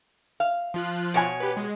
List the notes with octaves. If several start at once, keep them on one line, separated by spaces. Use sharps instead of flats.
F5
F3 F4 F#6
B2 C#5 G#5
G4 B4
G#3